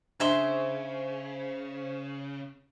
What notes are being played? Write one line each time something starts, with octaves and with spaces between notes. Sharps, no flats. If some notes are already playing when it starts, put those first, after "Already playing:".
C#3 D4 G#4 C5 E5 C6